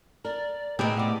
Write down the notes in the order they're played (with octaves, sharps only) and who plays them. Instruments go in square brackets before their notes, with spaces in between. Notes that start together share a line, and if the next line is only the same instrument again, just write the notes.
[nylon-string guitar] A#4 [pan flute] D5
[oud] A2 C4 [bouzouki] D#4 G#4 [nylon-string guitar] G4 B4 [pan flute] G5
[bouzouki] G3 B3 [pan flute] D6